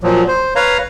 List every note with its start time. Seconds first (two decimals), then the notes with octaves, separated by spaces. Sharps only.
0.03 A#2 F3 F#3
0.28 C5
0.56 B4 C#5 F5 A#5